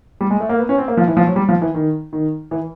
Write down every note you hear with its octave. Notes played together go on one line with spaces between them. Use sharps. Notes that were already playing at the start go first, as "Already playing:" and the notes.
G3
G#3
A3
A#3
B3
C#4
C4
A#3
F3
E3
F3
F#3
G3
F3
E3
D#3
D#3
E3